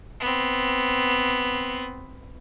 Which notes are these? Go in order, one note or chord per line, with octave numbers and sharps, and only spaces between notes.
B3 C4